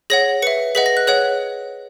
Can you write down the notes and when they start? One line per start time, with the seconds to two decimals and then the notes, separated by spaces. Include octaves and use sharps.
0.10 G#4 C#5 F#5 A#6
0.42 B4 E5 C#7
0.75 G#4 B4 D#5 F#5 B6
0.86 A#6
0.97 F#6
1.07 G#4 C#5 F#5 F#6